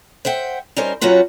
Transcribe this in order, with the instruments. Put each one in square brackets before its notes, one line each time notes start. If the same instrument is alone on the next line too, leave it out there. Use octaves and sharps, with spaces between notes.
[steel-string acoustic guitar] C5 E5 F#5 G5
G3 C#4 D#4 A#4 C5
F#3 C#4 D#4 F4 F#4 B4